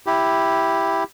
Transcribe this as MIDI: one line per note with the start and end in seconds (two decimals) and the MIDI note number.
0.07 1.04 64
0.07 1.04 67